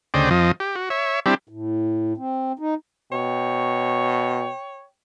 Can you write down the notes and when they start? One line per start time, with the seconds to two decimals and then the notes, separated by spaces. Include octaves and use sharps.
0.14 D2 C#3 C5 D5 D#5 G5
0.31 F2 F3 D#5
0.60 G4
0.76 F#4
0.90 C#5 E5
1.26 G3 C4 D4 E4 G4
1.49 A2
2.17 C4
2.59 D#4
3.12 B2 C#5 G5